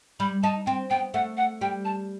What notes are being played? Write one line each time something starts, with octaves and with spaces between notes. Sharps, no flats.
G3 B5
D#4 A5
C4 G5
B3 G5
A3 F#5
F#5
G3 G5
A5